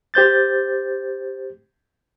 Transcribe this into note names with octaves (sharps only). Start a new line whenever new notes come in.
G4 C5 G6 A6